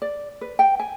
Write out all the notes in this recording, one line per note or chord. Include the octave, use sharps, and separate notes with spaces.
D5
B4
G5
G#5